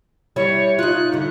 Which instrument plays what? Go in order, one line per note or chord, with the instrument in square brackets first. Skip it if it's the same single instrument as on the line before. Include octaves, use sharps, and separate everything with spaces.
[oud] G3 E4 [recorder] C#5
[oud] D#4 F4 [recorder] F#6
[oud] G2 D3